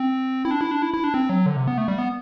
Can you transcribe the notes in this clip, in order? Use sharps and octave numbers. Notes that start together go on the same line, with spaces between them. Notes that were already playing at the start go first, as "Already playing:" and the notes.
Already playing: C4
E4
D4
E4
D4
E4
E4
D4
C4
F#3
D3
C3
B3
A3
G3
B3